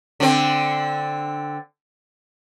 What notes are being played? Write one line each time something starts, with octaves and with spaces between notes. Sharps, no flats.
D3 C4